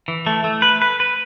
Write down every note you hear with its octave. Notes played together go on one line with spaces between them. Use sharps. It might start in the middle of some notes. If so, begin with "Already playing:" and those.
E3
A3
A3
B4
B4
B4